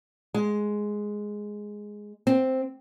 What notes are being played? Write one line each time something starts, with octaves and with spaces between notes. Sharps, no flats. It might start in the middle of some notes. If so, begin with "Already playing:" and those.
G#3
C4